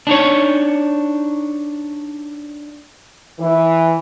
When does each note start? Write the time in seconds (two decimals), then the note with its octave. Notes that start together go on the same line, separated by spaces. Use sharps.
0.07 D4 D#4 C#5
3.39 E3